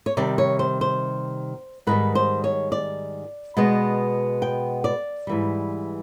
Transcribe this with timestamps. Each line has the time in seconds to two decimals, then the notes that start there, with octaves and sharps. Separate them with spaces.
0.06 C#5
0.17 C3 D#3 G3 D5
0.38 C#5
0.59 C5
0.81 C5
1.87 G#2 D#3 G3 B4
2.15 C5
2.44 C#5
2.72 D5
3.57 B2 G#3 B3
4.42 G5
4.84 D5
5.27 G#2 E3 G3